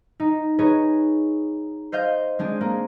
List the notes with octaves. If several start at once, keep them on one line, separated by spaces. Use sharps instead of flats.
D#4
D#4 G#4 B4 C#5
C5 D#5 F5 G6
G#3 C4 D4 G#4
A#3 G#4